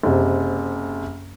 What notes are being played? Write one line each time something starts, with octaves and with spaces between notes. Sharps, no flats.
F#1 C3